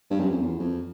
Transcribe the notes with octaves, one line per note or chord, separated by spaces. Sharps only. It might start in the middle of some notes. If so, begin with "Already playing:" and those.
G2
F#2
F2
E2
F2